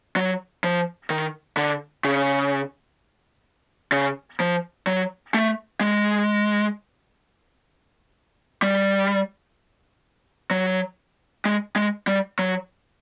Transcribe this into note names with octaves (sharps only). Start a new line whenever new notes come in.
F#3
F3
D#3
D3
C#3
C#3
F3
F#3
A3
G#3
G3
F#3
G#3
G#3
G3
F#3